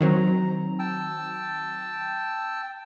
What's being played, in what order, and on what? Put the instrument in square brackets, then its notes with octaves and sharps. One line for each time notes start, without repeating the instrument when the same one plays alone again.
[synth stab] D#3 F#3 C4 [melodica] A#5
[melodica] G5 A5 E6